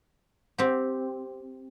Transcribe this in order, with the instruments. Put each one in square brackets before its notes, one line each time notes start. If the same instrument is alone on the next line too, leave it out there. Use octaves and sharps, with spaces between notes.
[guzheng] C4 G4